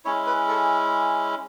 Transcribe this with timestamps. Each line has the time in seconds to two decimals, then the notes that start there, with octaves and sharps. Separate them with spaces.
0.05 G#3 C#4 E4 C#5
0.26 B4
0.48 A4